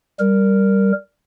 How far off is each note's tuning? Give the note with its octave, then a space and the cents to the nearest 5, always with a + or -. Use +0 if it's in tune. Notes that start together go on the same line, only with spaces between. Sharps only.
G3 +0 A#4 -5